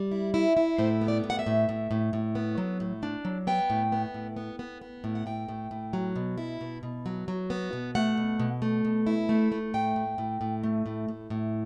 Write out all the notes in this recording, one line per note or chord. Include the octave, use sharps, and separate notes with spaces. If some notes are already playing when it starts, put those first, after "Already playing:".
Already playing: G3
E4
E4
E4
A2 C5
B3
D5
A2
F#5
E5
A2
A2
A2
A2
B3
F#3
A2
D4
F#3
B3 G5
A2
B3
A2
B3
B3
B3
A2
F#5
A2 G5
A2
A2
F#3
B2
E4
B2
B2
F#3
F#3
B3
B2
A3 F#5
B2
B2
A3
B2
E4
A3
A3
A2 G5
A2
A2
A2
A3
A2
A2
A2